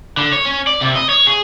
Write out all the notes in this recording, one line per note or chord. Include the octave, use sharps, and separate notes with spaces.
D3
C#5
C#4
D5
C3
D#5
C#5
G#4